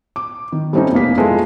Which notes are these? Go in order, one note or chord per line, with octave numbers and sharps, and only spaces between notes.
D6
D#3
G3 A3 C4 C#4 D#4
F1 B2 A#3 B6
G#3 A3 E4 F4 B4